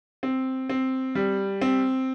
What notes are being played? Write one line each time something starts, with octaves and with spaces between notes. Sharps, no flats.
C4
C4
G3
C4